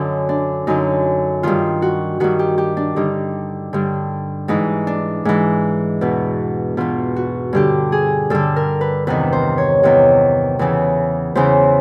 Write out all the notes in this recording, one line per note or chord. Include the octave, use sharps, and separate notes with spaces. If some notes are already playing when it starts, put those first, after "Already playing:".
Already playing: F#2 D3 D#4
D4
F#2 D3 D#4
G2 D#3 F4
F#4
G2 D#3 F#4
G4
G4
D4
G2 D3 D#4
G2 D3
G#2 E3 D#4
D4
G#2 E3
E2 B2
E2 B2 F4
F#4
G2 D3 G4
G#4
G2 D3 A4
A#4
B4
E2 C3 D#3 B4
C5
C#5
E2 C3 D#3 C#5
E2 C#3 E3
E2 C#3 E3 C5